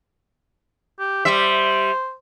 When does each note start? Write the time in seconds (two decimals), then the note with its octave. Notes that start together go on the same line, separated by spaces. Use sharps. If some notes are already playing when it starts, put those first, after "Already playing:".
0.99 G4
1.25 G3 C5 E5